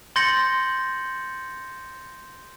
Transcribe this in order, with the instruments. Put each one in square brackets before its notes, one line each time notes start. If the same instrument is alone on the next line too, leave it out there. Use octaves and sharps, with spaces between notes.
[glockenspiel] C6 G6 A6 A#6 C#7 F#7